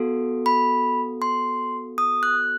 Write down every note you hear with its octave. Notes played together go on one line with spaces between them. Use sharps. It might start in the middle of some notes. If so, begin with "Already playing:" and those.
Already playing: B3 F#4 A4
B5
C6
D#6
F#6